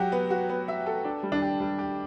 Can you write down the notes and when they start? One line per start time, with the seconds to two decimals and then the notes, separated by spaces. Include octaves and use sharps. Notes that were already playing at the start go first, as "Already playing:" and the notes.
Already playing: F#3 F#4 G4
0.12 B3
0.30 F#4
0.49 B3
0.68 E5
0.86 A4
1.04 D4
1.23 G3
1.32 D4
1.42 G4
1.60 G3
1.78 G4